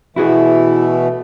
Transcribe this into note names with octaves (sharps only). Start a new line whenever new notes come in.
B2 E3 A3 E4 F#4 G#4